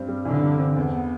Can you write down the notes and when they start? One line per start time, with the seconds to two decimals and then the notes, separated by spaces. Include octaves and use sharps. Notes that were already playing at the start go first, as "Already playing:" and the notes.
Already playing: G2 C4
0.08 G3
0.25 D3 E3
0.43 G2
0.59 C4
0.76 E2
0.93 B3